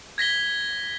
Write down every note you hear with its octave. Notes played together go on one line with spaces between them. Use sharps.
G#6 A#6 B6 G7